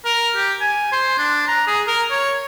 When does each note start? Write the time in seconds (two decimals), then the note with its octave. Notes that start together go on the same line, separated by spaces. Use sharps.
0.05 A#4
0.36 G4
0.61 G#5
0.92 C5
1.18 D4
1.48 A#5
1.67 G#4
1.87 A#4
2.11 C#5